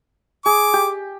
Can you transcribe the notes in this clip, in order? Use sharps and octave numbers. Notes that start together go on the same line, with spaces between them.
G#4 D6
G4